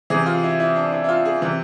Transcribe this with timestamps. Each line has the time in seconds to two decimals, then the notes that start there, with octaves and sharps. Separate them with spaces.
0.10 C3 E3 G#4
0.26 F4
0.44 E4
0.60 E4
0.76 D4
0.92 E4
1.04 E4
1.09 F4
1.25 G#4
1.42 C3 E3